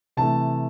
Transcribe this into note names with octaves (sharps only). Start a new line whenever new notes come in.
C3 E3 A3 A5